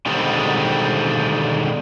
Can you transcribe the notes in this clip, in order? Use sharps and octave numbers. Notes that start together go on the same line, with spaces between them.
B2 D3 D#3 G3 G#3 C4